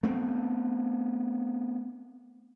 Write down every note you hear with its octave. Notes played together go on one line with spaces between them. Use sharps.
A3 B3 C4